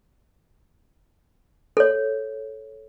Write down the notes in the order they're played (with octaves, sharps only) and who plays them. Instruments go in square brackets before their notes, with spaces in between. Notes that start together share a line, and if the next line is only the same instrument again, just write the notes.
[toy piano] A4 C#5